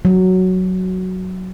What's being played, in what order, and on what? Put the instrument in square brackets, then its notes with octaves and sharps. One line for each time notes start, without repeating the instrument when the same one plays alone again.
[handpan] F#3